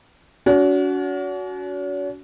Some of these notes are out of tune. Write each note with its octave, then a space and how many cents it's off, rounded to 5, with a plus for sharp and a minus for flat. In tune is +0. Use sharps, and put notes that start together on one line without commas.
C#4 +45 F#4 +0